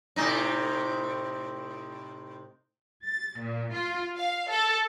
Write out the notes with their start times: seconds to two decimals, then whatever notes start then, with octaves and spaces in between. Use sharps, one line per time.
0.16 A2 C3 D#4
3.03 A6
3.39 A#2
3.74 F4
4.17 F5
4.50 A4